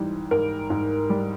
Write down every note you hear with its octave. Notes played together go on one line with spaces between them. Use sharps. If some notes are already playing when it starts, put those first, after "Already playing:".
Already playing: G#2 E3 G3
G#2 A#4
G#2
G3